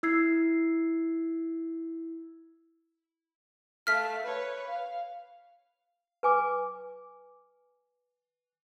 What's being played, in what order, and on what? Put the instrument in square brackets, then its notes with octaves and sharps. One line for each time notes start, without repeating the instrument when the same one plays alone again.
[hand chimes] E4 E6 G#6 C7
[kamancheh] A3 F5 [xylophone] F6 B6
[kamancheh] B4 C#5
F5
[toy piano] B4 G#5 D6